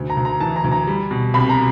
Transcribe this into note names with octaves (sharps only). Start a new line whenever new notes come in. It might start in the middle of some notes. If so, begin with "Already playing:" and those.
Already playing: D2
A#5
D2
A#5
E3 A5
A#5
D2
A#5
G3
B2
C2 B5
A#5